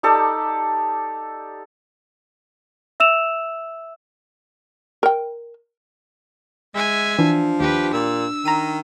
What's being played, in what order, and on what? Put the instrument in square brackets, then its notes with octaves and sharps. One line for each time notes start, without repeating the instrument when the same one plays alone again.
[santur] D#4 G4 A4 D5
[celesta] E5 E6 E7 F7
[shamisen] A#4 G5
[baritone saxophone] G#3 [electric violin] E5 G#5
[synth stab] E3 [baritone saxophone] F3 [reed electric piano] D4
[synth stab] D#2 [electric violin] G4 B4
[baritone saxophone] A#2 [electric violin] E6
[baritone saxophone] D#3 [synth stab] A#5 D#7